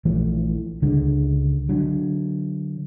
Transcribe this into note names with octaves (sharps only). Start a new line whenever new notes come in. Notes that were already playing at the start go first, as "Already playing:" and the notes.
A#1 E3 F3 A3
C#2 D3 G#3
D3 F#3